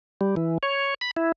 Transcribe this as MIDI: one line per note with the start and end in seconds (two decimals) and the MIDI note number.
0.21 0.35 55
0.36 0.58 52
0.63 0.94 73
1.01 1.11 83
1.17 1.32 64